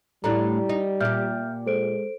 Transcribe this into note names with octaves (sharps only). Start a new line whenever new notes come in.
A2 G3 A3 D4 E4 A#5
D#4
A#2 G4 E5 F6 G6
G#3 A4 C5 D7